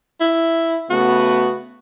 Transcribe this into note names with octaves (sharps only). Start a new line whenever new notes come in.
E4
C#3 A3 B3 F#4